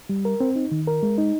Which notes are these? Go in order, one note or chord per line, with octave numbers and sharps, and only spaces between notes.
G3
A#4
C4
D#4
D#3
A#4
G#3
D#4